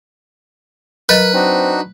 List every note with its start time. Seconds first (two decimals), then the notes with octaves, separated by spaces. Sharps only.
1.09 F#3 A#4 B4 D#5 A6
1.34 C4 D4 D#4 F#4